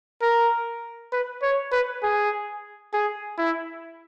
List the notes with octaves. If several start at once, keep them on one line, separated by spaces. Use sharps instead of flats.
A#4
B4
C#5
B4
G#4
G#4
E4